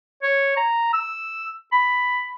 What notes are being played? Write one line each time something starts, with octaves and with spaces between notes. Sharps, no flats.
C#5
A#5
E6
B5